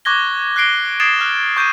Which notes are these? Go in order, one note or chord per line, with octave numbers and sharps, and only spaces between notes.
C#6 D6 F#6 G#6 A#6 G7
F#6 A#6 C7 D7 G7
D#6 G#6 A6 C7 D7 E7
F6 F#6
C#6 G6 G#6 D#7